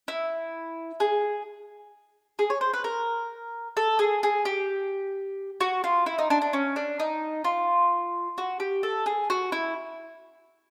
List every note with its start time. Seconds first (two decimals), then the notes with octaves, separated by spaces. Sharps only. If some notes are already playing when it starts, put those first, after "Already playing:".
0.08 E4
1.00 G#4
2.39 G#4
2.50 C#5
2.61 C5
2.73 B4
2.84 A#4
3.77 A4
3.99 G#4
4.23 G#4
4.45 G4
5.61 F#4
5.84 F4
6.06 E4
6.18 D#4
6.30 D4
6.42 D4
6.53 C#4
6.76 D4
7.00 D#4
7.44 F4
8.38 F#4
8.60 G4
8.83 A4
9.06 G#4
9.30 F#4
9.52 E4